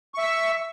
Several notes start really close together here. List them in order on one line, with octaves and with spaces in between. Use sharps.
C#6 E5 E6